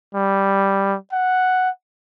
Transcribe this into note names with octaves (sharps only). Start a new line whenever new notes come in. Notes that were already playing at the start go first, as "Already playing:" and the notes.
G3
F#5